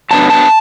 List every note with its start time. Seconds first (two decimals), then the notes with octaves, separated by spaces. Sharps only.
0.11 F#3 B3 D4 A5
0.30 A5